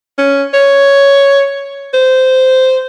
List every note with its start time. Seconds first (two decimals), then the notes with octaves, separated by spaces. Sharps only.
0.18 C#4
0.54 C#5
1.94 C5